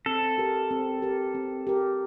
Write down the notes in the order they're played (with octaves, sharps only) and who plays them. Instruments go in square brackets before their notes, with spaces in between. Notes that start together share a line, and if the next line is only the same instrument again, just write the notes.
[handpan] C4 [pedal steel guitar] A4
[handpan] G4 A#4
C4
G4 A#4
C4
G4 A#4